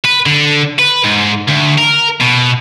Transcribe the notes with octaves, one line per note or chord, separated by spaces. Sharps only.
B4
D3
B4
G#2
D2
A#4
B2